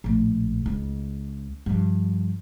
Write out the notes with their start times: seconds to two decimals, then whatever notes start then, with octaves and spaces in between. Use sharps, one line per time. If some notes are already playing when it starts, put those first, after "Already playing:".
0.04 A#1 A2
0.66 C#2 C#3
1.66 G2 F3